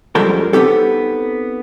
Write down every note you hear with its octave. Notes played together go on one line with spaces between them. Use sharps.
F#2 F3 G3 G#3 A4 A#4
B3 C4 D#4 G4 A4